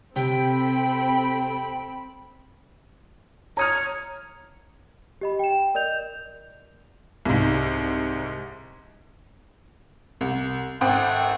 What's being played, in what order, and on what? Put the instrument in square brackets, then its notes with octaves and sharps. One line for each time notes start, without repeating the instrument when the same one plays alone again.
[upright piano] C3 [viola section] C4 A4 B5 [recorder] G5
[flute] C#5 [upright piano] A#5 D#6 F6
[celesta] G4 D#5 B5
G5 E7
A#4 D5 D#5 G6 F7
[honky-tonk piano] C2 G#2
C2
[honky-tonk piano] G#1 C5 G5 [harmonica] A3 F#5